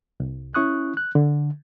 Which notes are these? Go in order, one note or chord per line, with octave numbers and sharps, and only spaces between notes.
C2
C#4 E4 C#6 D#6 F#6
F#6
D3